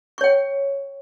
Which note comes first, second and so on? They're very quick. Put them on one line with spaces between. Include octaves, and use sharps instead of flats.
C#6 C#5 G5